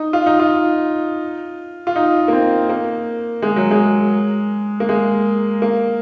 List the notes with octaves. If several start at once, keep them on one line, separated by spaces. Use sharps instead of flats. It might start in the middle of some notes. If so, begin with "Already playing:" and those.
Already playing: D#4
F4
D#4
F4
F4
D#4
A#3
C4
A#3
G#3
F#3
G#3
A#3
G#3
A#3